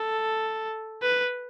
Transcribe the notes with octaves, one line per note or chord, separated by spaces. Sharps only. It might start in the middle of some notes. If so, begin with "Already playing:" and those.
Already playing: A4
B4